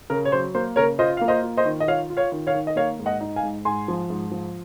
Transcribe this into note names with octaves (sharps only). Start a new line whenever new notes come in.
C#3 A#4
C#5
F#3 C5
A#3 C5
C#3 A#4 C#5
F4 C5 D#5
A#3 F5
C5 D#5
F4
C5 D#5
D#3
D#5
F4 C#5 F5
F4
C#5 F5
D#3
C#5 F5
D#3
D#5
A#3 C#5 F5
G#2
D#5 F#5
D#4
F5 G#5
G#2
G#2 G#5 C6
F3
G#2
F3